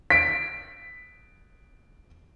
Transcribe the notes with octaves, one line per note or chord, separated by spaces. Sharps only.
B6 D7